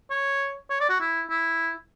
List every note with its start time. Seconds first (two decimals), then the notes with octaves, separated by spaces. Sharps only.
0.10 C#5
0.70 C#5
0.81 D5
0.89 F#4
1.00 E4
1.29 E4